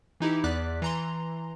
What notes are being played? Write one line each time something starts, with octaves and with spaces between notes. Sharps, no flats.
E3 D#4 E4 G4
E2 D5 D6 F#6 B6
E3 A#5 C6